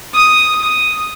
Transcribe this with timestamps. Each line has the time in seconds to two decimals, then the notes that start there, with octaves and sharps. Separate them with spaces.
0.13 D#6
0.61 D#6